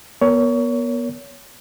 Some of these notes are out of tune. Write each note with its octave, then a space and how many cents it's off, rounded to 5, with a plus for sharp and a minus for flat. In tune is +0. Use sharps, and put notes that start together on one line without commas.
B3 -30 A#4 +0 C#5 +25